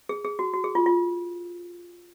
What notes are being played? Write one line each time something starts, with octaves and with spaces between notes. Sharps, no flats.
G#4
G#4
F#4
F#4
G#4
F4
F4